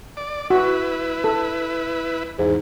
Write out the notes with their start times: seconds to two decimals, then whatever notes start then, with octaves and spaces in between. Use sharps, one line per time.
0.17 D5
0.50 E4 F#4 B4
1.24 A4
2.38 E2 G#2